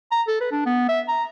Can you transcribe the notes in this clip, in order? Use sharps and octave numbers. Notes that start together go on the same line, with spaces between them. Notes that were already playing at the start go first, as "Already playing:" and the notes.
A#5
A4
B4
D4
B3
E5
A#5